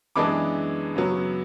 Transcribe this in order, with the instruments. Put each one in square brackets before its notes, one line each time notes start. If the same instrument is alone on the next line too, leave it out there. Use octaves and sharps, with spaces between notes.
[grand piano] F#2 E3 G#3 B3 D4 B5 D6
F#2 C#3 F#3 B3